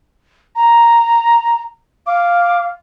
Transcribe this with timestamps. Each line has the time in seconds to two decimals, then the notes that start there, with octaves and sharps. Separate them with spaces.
0.56 A#5
2.07 F5 D6